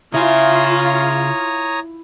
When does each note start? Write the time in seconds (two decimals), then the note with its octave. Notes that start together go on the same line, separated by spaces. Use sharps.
0.14 C#3 E4 F4 C#5 G#5 A#5 D#6